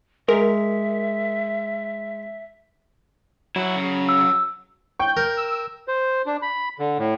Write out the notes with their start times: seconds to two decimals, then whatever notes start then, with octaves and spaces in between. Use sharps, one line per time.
0.29 G#3 A#4 E5
3.56 F#3 E4 F#4
3.76 C#3
4.09 E6
4.99 G5 C#6 G6
5.17 A#4
5.37 E6
5.88 C5
6.26 D4
6.42 B5
6.79 D3
6.98 A2